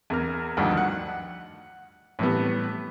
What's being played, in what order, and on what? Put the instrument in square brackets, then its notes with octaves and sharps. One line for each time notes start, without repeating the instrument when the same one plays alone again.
[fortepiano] E2 A#4 F6
D2 G2 D3 D#3 F3
F#5
A2 E3 G3 B3